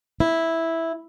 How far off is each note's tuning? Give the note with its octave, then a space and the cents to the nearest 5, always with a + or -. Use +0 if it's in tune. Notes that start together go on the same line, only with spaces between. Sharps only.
E4 -5